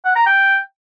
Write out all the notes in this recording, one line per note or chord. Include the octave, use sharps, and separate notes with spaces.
F#5
A#5
G5